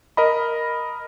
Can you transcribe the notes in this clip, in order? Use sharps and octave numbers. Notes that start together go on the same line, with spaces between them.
A#4 D#5 B5